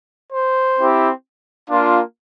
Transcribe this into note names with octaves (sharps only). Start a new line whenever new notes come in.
C5
C4 E4 G4
A#3 D4 F4